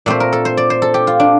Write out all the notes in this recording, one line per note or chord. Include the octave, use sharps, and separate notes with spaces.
A#2 A3 C4 C5
A#4
A4
C5
D5
C5
A4
G4
F4
D4